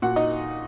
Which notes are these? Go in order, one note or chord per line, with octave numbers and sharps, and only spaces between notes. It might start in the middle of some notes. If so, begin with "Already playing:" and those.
A#2 F#4 F#5
D#4 D#5